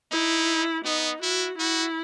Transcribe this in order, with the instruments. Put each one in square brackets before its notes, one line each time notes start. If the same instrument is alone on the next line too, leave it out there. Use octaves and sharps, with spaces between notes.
[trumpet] D#4 [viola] E4
[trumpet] B3 [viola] D#4
[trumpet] E4 [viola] F#4
[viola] E4 [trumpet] F#4